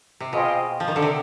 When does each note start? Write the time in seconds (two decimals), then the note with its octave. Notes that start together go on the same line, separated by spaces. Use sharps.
0.20 C3
0.32 B2 F4 G#4 C5 D#5 G5
0.80 F3
0.88 D#3
0.96 D3
1.02 C3